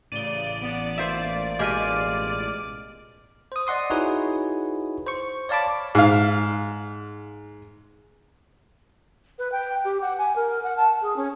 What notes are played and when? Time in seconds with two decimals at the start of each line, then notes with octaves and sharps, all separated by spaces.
0.12 A1 C#3 D5 D7 D#7 G7
0.62 B3
0.97 A#3 F4 C5 E5
1.59 B2 G#3 G4 D6 F6 D#7
3.52 C5 D#6
3.67 D5 D#5 F#5 C6 D#6
3.90 D#4 E4 F#4 G#4 B4 C#5
5.06 C5 C#6
5.49 C#5 D5 F5 A5 B5 D6
5.95 G#2 F5
9.39 B4
9.52 G5
9.84 G4
10.02 F#5
10.18 G#5
10.36 A#4
10.63 F#5
10.77 A5
11.02 G#4
11.16 C#4